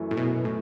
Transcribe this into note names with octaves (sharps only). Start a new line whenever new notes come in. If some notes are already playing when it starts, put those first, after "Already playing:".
Already playing: F#2 E3 A3
A2
B2
A2